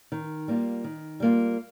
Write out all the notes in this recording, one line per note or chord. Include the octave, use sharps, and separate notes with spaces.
D#3
G3 A#3 F4
D#3
G3 A#3 F4